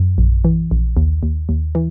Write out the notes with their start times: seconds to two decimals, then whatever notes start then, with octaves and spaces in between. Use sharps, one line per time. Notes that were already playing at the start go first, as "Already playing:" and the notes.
Already playing: F#2
0.18 A#1
0.45 E3
0.71 A#1
0.97 D#2
1.23 D#2
1.49 D#2
1.75 E3